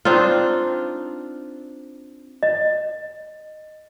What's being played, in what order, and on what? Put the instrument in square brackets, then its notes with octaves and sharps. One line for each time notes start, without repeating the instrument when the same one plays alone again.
[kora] C4 D4 D#4 F4
[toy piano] D#5